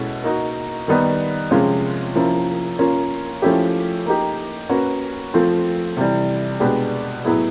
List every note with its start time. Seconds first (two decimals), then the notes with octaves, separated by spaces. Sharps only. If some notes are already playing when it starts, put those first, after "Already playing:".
Already playing: B2 G#3 C#4 E4 A4
0.24 A#3 D#4 F#4
0.88 D#3 G3 B3 D#4
1.51 C3 F3 G#3 C#4 F4
2.15 F3 A#3 C#4 E4
2.79 A#3 C#4 F4
3.42 F3 A3 C#4 E4 G4
4.06 A#3 D#4 G4
4.69 A#3 C#4 F#4 B4
5.34 F3 A3 C4 F4
5.97 C3 E3 G3
6.60 B2 G#3 B3 D4 G4
7.24 A2 F#3 B3 E4 G#4